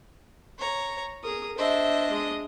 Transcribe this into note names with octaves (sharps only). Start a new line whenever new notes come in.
C#5 A#5
G#4 A#4 D#6
D4 C5 D#5 E5
G#3 D#6